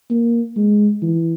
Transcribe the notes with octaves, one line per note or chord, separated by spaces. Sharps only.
A#3
G#3
E3